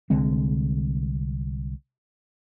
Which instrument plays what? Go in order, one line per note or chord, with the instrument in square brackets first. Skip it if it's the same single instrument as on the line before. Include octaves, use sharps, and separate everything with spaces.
[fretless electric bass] C2 D3 G#3 C4